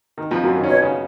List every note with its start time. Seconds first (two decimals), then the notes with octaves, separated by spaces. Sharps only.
0.18 D#3
0.31 F2 F3
0.44 F#2 F#3
0.56 D#3
0.64 C#4
0.69 B2 B3 C#5
0.82 C#3 C#4